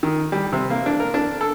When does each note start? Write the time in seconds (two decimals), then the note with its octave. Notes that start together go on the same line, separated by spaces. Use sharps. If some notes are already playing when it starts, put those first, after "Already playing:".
0.03 D#3
0.32 G3
0.53 C3
0.70 A#3
0.86 D4
1.00 A#4
1.14 D4
1.41 A4